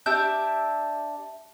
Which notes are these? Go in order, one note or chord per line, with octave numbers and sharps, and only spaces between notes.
D4 G4 E5 G6